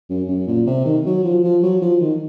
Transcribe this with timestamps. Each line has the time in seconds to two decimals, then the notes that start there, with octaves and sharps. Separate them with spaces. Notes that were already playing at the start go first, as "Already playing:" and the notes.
0.09 F#2
0.28 F#2
0.47 A#2
0.67 C3
0.85 D#3
1.05 F#3
1.24 F3
1.43 F3
1.63 F#3
1.82 F3
2.00 D#3